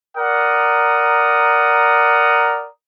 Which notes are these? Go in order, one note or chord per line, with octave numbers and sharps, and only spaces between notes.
A#4 D5 F#5 A#5 D#6